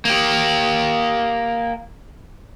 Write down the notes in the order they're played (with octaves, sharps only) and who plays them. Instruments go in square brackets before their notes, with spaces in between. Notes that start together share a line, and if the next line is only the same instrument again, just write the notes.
[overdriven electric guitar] A#3 G4